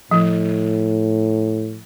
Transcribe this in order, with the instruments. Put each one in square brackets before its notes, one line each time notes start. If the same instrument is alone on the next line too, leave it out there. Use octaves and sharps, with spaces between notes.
[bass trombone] A2 [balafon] F3